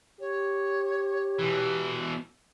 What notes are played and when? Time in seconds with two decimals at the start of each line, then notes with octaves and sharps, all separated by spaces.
0.20 G4 C#5
1.39 B2 E3